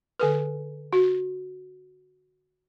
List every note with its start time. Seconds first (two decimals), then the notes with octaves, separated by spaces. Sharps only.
0.20 D3 A4 B4
0.93 F#4